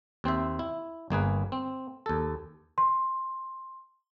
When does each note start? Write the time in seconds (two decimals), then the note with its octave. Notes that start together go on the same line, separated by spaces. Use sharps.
0.24 D#2 C4 C5 E5
0.59 E4
1.10 G1 A#3 G#4 B4
1.52 C4
2.06 D#2 A4
2.78 C6